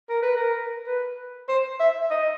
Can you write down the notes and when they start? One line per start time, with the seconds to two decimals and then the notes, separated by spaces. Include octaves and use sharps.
0.09 A#4
0.22 B4
0.36 A#4
0.86 B4
1.49 C5
1.80 E5
2.11 D#5